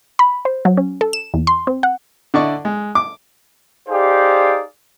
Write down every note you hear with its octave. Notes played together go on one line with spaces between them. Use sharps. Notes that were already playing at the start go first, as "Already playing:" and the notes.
B5
C5
F#3
C#4
A4
E7
E2
C6
C4
F#5
D3 E4 D5 D#5 C#6
G#3
D6
D#4 G4 G#4 C5 D5 F5